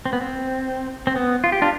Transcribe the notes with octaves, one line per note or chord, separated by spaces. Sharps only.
C4
B3
C4
C4
B3
F4
G4
D4 F4